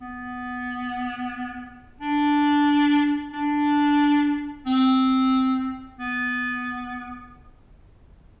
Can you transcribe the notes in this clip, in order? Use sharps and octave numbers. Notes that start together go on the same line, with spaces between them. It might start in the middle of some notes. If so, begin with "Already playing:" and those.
B3
D4
D4
C4
B3